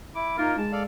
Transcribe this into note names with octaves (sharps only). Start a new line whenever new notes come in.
E4 D6
A#3 D#4 F4 A#4
G#3 A5
A4 D5 F5